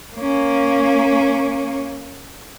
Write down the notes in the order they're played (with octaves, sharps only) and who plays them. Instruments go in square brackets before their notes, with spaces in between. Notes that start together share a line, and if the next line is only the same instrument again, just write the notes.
[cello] A#3 C#4